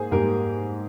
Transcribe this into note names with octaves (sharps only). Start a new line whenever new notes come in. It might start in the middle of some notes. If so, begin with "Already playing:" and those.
Already playing: G#2 A#3 G#4 C5
G#2 G3 A#3 G4 A#4